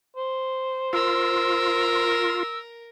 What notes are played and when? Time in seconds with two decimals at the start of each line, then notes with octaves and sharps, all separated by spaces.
0.17 C5
0.93 F4 A#4 E6